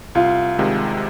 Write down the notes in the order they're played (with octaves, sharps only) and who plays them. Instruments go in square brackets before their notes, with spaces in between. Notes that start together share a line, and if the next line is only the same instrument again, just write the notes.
[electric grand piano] C2 [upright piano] F4
[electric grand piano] C3 D#3 G#3